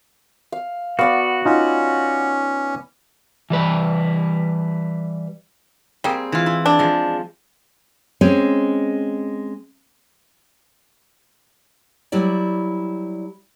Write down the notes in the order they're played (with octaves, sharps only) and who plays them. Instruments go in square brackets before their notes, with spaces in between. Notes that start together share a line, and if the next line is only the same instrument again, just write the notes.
[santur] F5
[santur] B3 D5 B5 [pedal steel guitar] F#4 [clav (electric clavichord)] F5
[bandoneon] C#4 [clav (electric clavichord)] D#4 F4
[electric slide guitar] E3 G3 B4
[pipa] G3 A#3 [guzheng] C4 G#4
[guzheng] E3 F4
E4
[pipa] D4
[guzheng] F3 G#3
[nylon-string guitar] G#3 C4 C#4
F#3 G3 E4 D5